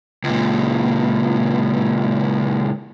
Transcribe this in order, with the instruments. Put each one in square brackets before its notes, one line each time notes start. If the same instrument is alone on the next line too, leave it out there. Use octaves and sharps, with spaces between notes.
[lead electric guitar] C#2 A#2